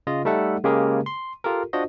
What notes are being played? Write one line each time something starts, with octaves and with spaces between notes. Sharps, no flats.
C#3 F4 D#5
G3 A3 D#4 A4 E5 F#5
C#3 G#3 A#3 G4 G#4 A#4
C6
F4 G4 A4 A#4
D4 F4 F#4 C5 D#5